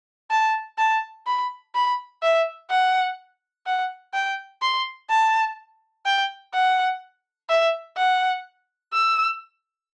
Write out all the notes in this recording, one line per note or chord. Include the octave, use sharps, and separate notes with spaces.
A5
A5
B5
B5
E5
F#5
F#5
G5
C6
A5
G5
F#5
E5
F#5
E6